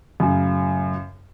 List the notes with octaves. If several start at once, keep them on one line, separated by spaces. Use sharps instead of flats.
F#2 A2 C#3